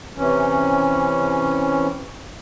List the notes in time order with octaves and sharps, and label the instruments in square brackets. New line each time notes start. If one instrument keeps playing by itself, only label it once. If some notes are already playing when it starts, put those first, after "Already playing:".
[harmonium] C3 E3 C#4